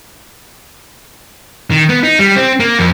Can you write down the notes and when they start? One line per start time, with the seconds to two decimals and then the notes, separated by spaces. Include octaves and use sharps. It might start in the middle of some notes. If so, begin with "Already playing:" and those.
1.71 D#3
1.89 B3
2.03 D#4
2.19 G3
2.36 C4
2.60 A#3
2.79 F2